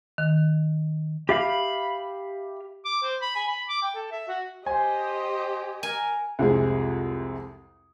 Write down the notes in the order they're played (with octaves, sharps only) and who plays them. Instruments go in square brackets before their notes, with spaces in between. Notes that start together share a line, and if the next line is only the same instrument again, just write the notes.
[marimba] D#3
[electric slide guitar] G4 E5 F5 [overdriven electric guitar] B5
[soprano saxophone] D6
C5
B5
G#5
B5
D6
G5
A4
E5
F#4
[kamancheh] G4 D#5 [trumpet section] C5 [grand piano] G#5
[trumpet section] A#4 [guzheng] G#5
[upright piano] C2 F2 C3 G#3 G#4